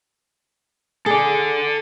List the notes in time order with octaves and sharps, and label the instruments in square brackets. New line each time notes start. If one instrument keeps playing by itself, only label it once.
[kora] G#4 [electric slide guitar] A4 D5